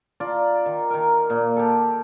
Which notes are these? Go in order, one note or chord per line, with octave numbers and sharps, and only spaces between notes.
F4 D5 A#5
D#3
D#3 A#4
A#2
G4 A4